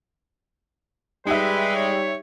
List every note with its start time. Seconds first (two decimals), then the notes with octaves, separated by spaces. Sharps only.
1.27 G3 G#3 D#4 G4 B4 E5
1.75 C#5